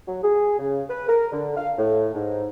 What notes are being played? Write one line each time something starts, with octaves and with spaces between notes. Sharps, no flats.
F#3
G#4
C#3
B4
A#4
D3
F5
A2
G#2